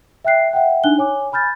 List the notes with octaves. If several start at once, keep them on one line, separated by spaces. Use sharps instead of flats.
E5 G5 F#6 C7
E5 F#5 G5
D4 D#4 G#5 F#6 G7
C#5 G#5 D6
G#5 B5 F6 G6 A6